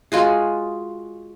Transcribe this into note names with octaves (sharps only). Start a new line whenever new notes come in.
G#3 F4 F#4 G#4